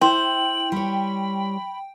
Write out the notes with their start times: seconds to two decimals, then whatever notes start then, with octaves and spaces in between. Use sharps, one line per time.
0.01 E4 C5 G5 F#7
0.72 G3 C#5 B5